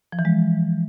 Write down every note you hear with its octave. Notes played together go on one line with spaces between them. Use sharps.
F3
E3
G#3